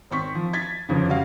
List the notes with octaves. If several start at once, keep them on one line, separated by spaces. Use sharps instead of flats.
G#1 C4 C#6 B6
F3
G#6 A6 B6
G1 F2 C#3
C#3 G3 F#4 F5